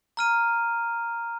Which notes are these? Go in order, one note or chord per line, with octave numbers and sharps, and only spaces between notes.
A#5 F6 D#7